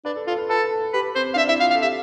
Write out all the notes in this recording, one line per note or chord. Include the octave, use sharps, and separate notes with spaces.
D4 B4
A4
F4 A4
B4
A4 B4
A4
G4 B4
C4 C5
D4 E5 F5
E4 E5
F4 F5
F5
A4
G4 E5